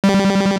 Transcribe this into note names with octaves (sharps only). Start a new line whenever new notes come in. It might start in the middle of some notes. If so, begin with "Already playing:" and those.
G3